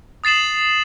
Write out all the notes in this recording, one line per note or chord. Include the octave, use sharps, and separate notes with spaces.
D#6 A6 C7 E7 F#7